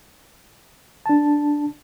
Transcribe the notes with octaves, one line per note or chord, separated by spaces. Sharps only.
D4 A5